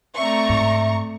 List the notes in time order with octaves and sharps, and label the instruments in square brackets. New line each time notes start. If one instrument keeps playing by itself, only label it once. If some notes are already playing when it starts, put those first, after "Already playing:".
[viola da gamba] A3 C4 D5 [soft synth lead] E5 [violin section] A#5 C#6
[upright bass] G#2